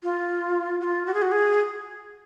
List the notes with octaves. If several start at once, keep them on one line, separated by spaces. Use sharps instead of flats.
F4
F#4
F4
F#4
G#4
F#4
G#4